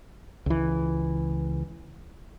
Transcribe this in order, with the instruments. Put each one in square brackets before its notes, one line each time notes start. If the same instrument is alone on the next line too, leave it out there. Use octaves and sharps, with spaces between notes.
[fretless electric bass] C#2 E3